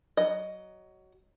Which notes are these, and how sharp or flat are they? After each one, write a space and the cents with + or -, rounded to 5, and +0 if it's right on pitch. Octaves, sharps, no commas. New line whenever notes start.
F#3 +15 D#5 +0